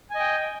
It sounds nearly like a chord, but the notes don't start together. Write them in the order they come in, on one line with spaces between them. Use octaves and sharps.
G#5 D#5 G5